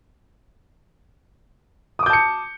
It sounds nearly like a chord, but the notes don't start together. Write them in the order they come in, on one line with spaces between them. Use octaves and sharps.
D#6 D6 G6 A5 C#7